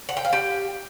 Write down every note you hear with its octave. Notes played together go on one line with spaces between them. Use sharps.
F#5
G5
F5
G4